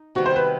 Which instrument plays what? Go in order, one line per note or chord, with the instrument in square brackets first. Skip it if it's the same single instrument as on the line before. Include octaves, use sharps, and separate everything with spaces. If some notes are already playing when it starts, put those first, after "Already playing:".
Already playing: [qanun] D#4
[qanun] C3 D#3 G3 B3 [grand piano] F#4
[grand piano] C5
B4